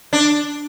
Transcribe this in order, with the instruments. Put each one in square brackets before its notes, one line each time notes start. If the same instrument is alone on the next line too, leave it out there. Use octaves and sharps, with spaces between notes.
[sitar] D4